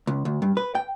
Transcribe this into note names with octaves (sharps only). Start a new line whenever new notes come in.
C#2
D2
G2
B4
G5